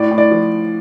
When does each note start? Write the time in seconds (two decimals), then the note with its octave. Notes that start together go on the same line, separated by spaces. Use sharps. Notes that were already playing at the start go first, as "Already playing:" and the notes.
Already playing: A2 D5
0.11 A2
0.18 D5
0.31 F3